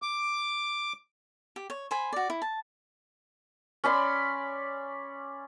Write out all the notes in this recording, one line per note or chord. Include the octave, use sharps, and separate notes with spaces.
D6
G4
C#5
C5 G#5 B5
F#4 D5
E4
A5
C#4 D5 B5 C6